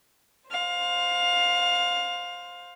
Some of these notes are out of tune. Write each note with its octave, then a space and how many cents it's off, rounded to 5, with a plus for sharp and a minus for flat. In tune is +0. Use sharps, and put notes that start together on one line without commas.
C5 +0 F5 +20